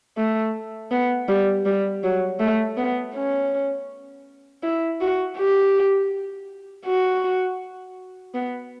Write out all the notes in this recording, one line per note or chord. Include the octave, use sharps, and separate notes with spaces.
A3
B3
G3
G3
F#3
A3
B3
C#4
E4
F#4
G4
F#4
B3